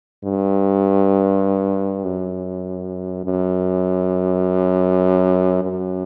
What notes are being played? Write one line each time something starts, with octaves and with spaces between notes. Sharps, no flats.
G2
F#2
F#2
F#2